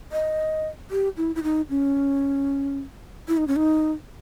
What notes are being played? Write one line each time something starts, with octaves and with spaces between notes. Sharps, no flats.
D#5
G4
E4
E4
D#4
C#4
E4
D#4
C#4
D#4